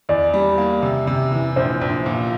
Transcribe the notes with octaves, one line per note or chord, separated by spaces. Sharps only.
E2 D5
G3
A#3
C3
C3
E3
A#1 C5
A#1
A#2